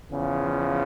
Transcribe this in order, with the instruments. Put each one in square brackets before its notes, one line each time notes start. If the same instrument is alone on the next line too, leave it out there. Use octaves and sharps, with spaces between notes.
[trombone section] E2 C#3 F3